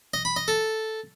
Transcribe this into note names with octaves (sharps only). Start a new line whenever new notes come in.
D#5
B5
D#5
A4